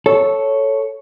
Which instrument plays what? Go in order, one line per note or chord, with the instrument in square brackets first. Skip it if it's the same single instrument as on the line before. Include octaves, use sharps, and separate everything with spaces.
[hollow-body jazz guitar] A4 [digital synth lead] C#5